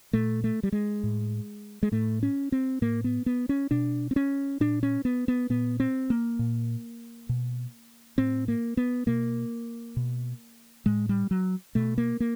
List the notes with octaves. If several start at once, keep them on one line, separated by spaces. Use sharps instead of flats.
A#2 A3
A3
G3
G#3
A2
G#3
A2 A3
C#4
C4
A2 A#3
B3
B3
C#4
B2 D4
C4
C#4
A#2 D4
C#4
B3
B3
A#2 B3
C4
A#3
A#2
B2
A2 C4
A#3
B3
B2 A#3
B2
A2 G#3
G3
F#3
B2 A3
A#3
A#3